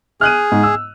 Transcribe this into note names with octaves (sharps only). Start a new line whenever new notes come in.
G#4 F6 F#6 D#7
G#2
E6